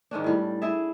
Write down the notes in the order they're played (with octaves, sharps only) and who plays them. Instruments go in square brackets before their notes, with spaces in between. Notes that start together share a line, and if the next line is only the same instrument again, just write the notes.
[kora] G#2 D#3 C#4 D4
A2 G3
E4 G#4 E5